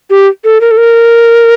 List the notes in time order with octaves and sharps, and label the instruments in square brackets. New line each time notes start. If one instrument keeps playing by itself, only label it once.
[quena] G4
A4
A#4
A4
A#4